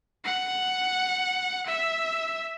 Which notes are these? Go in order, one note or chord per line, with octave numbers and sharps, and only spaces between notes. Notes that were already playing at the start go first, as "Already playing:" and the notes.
F#5
E5